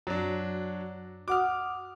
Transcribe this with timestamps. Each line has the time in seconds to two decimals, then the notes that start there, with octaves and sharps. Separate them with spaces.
0.07 F#2 F#3 D4
1.28 F#4 F#5 D6 D#6 F6